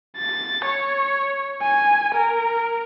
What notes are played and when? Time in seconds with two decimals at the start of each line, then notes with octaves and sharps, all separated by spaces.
0.17 A6
0.65 C#5
1.62 G#5
2.15 A#4